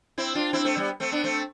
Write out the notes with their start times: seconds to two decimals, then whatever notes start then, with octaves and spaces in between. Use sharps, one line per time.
0.18 C4 E4
0.35 D4 F4
0.53 C4 E4
0.65 A3 C4
0.77 G3 B3
1.00 A3 C4
1.12 B3 D4
1.24 A3 C4